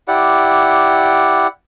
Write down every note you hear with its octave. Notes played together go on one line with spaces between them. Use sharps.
E4 G4 D5 F#5